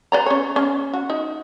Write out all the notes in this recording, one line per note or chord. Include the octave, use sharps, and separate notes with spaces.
B4 D5 A#5
C#4 C#5
C#4
F#4
D#4